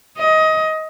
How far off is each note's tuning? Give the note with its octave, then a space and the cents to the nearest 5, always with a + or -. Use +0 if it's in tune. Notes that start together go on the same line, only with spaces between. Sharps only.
D#5 +20